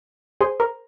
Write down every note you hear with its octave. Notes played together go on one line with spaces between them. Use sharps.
G#4 C5
A#4